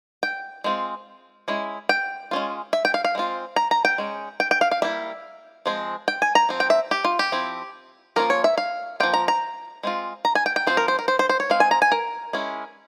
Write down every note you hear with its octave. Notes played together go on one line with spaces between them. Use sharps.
G5
G#3 C4 F4
G#3 C#4 E4
G5
G#3 C#4 F4
E5
G5
F5
F5
G#3 C4 F4
A#5
A#5
G5
G#3 C#4
G5
G5
F5
F5
G3 A#3 E4 E5
F3 G#3 C4
G5
G#5
A#5
F3 C4
G5
E5
G4
F4
G4
F3 C4 E4
F3 A#3 C#4 F4 A#4
C#5
E5
F5
F3 A#3 F4 G5
A#5
A#5
G#3 C4 F4
A#5
G#5
G5
G5
F3 C4 F4 C5
A#4
C5
A#4
C5
C5
C5
C#5
G#3 C4 F5
G#5
A#5
G#5
A#4
G#3 C#4 E4